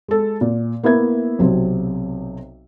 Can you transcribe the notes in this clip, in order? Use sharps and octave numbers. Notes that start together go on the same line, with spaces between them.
G#3 A4
A#2
A#3 B3 E4 E5 G#6
B1 C3 F#3 C4